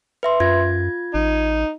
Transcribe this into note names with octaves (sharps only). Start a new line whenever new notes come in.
B4 E5 C6
F#2 F4 G#6
A1 D#4